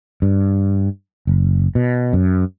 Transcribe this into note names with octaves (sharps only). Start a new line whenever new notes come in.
G2
F#1
B2
F#2